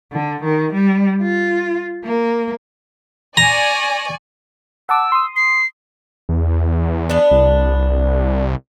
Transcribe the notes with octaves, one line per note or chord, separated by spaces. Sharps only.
D3
D#3
G3
F4
A#3
D5 G#5 A#5 C#6
F#5 A5 D6 E6
C6 D#6
C7
E2
B3 D4
C2